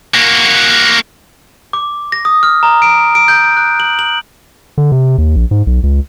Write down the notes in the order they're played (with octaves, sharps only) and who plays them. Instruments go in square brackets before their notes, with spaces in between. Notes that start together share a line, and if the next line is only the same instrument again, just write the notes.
[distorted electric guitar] A#3 F#4
[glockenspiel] D6
A#6
D#6
F6
A#5
D7
D7
G6
F#6
F#7
F#7
[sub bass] D3
C3
D#2
A#1
G#2
B1
C#2